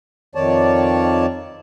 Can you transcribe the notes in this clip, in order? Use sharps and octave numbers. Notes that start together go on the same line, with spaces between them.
F2 D#3 C#5 D5 A5